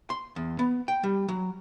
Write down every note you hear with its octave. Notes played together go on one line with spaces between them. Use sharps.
C6
E2
B3
G5
G3
F#3